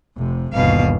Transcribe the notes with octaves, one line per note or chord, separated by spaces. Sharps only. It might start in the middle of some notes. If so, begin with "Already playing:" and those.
F1 C3
G1 D#2 B2 F5